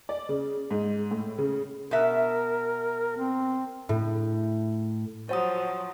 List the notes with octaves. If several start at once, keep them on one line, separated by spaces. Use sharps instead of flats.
D5
C#3
G#2
A2
C#3
B2 A#4 E5
C4
A2
F3 F#3 C5 C#5 F#5 D#6